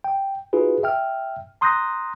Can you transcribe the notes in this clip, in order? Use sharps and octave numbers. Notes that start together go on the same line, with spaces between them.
G5
D#4 F4 F#4 G#4 B4
E5 G5 F6
A#5 C6 D#6 F#6 G6 A#6